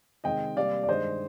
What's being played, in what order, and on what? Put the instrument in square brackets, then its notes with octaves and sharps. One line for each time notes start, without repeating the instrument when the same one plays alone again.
[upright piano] C3 D#3 G#3 C4 D#5 G5
C3 G3 A#3 D5 F5
D5
G2 D#3 G#3 C5 D#5